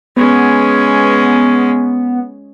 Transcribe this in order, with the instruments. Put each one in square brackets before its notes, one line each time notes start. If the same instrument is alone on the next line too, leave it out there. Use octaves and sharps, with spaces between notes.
[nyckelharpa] G#3 C#4 [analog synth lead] B3